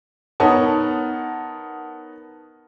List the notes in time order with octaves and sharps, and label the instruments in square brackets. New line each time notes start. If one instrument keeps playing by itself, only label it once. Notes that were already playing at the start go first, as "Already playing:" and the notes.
[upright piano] B3 D#4 A#4 C#5 F#5 A5